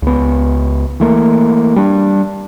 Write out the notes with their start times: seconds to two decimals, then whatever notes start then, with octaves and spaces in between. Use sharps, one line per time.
0.02 C#2 B3
1.00 E3 A3 A#3
1.76 G3 D4